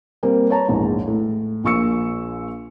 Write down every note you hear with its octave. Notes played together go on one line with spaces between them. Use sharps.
G3 A#3 C4
B4 C#5 A5 A#5
A#1 E2 G#2
A2
A#1 A#2 C#6 E6 C#7